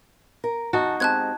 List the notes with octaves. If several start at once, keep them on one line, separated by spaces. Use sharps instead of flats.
A#4
E2 D#4 F#4 A5
G#3 C4 G4 A5 F#6 G#6